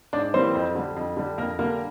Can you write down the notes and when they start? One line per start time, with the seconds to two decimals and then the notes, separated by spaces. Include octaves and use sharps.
0.13 G#2 D4 D5
0.34 E3 G3 A#3 C4 C5
0.55 F2
0.75 D3 G3
0.96 F2
1.17 D3 G3
1.38 F2 A#3 A#4
1.59 D3 G3 A#3 A#4